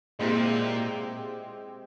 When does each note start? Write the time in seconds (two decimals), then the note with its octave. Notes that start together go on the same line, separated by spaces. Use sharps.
0.19 A#2 G#3 C4 E4 G4